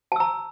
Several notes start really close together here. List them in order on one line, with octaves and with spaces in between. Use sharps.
A5 E6 A#5